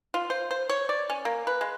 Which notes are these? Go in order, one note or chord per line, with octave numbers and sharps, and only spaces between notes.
F4
C5
C5
C#5
D5
C#4
A#3
B4
G#3